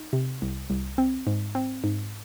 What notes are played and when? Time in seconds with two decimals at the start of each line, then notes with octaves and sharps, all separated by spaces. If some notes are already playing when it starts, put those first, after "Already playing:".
Already playing: D#4
0.13 C3
0.42 C2
0.70 C2
0.98 C4
1.27 G#2
1.55 C4
1.84 G#2